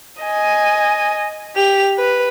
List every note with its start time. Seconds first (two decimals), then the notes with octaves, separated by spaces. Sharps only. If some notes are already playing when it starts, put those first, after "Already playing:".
0.23 D#5 G#5
1.56 G4 F7
1.98 B4